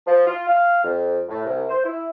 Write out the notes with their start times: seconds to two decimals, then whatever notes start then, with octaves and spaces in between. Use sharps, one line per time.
0.07 F3
0.27 F4
0.47 F5
0.84 F2
1.28 A2
1.44 C2
1.69 C5
1.84 E4